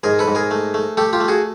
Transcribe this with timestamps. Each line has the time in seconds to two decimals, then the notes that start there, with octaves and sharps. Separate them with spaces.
0.03 G#2 G#4 A#4
0.19 A4 B4
0.28 G#2
0.35 G#4 A#4
0.51 A3
0.74 A3
0.97 A3 G4 A4
1.13 F4 G4
1.20 A3
1.28 F#4 G#4